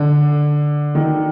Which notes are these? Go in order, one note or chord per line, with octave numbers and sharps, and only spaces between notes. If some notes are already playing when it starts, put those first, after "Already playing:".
Already playing: D3
D#3